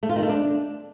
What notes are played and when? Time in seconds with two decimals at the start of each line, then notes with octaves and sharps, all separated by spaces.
0.03 A3
0.09 F4
0.16 D#3
0.23 A3
0.29 D4